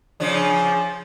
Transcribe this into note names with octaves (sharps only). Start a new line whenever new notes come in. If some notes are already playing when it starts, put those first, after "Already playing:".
C#3 F3 D4